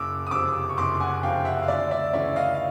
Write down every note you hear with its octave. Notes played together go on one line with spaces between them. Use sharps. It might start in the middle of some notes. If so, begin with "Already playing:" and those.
Already playing: F#1 D6 E6
D#6
F2 C3 D6 E6
C#6
F#1 C6 D6
F#5 G#5
F2 C3 F5 G5
E5 F#5
F5
D2 D5 E5
D5 E5
C#3 E3 D5 E5
D#5 F5
F5